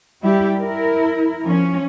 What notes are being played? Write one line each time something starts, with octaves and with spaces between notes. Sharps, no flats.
G3 E4 G4
E4 A#4
F3 C#4